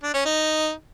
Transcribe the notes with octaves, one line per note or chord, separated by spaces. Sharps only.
D4
C#4
D#4